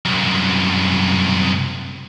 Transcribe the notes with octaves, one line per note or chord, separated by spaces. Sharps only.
C2 F#2